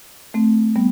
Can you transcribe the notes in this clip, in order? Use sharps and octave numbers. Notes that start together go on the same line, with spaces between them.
A3 C4
G3 B3